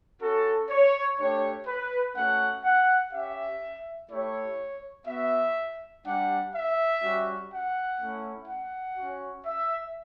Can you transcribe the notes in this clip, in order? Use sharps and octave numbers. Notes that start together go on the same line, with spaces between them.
C#4 F#4 A4
C#5
A3 D4 G4 C#5
B4
A3 C#4 F#4 F#5
F#5
C#4 G4 E5
A3 E4 G4 C#5
B3 F#4 E5
G3 D4 G4 F#5
E5
G3 C#4 F#4
F#5
A3 C#4 E4
F#5
C#4 F#4
E5